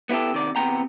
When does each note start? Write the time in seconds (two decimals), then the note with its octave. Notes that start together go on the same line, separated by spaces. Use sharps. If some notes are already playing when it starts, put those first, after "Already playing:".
0.09 B3 E4 F4 G4 A4
0.32 C3 D#3 D5
0.56 E2 C3 B3 C4 G5 A#5